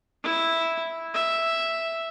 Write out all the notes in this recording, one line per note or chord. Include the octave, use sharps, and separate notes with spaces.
E4
E5